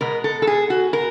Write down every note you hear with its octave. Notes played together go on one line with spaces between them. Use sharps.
B2 G#3 B3 A#4
A4
A4
G#4
F#4
A#4